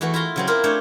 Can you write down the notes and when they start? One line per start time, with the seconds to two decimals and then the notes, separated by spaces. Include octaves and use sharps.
0.01 E2 E3 A3 F#4
0.14 E4 F4 A#5 C6
0.36 C#3 F#3 C4
0.47 A#3 E4 F4 A#4
0.64 A3 D4 C5 C#5 F5